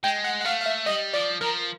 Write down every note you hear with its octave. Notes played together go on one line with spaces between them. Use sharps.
G#3 G5
F#5
F#5
A3 F5
F5
E5
G3 D#5
F3 D5
F3 A#4